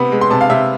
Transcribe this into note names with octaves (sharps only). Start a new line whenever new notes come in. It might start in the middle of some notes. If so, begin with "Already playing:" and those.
Already playing: C3 B3 B5
G#3
C6
C3 A5
F5
C3 E5